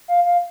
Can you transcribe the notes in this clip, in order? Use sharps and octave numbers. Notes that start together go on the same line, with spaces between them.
F5
F5